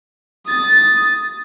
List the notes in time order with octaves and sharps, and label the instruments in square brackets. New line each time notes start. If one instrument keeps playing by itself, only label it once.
[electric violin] D#6 A6